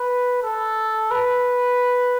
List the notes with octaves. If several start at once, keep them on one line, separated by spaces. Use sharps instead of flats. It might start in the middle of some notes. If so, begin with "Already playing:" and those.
Already playing: B4
A4
B4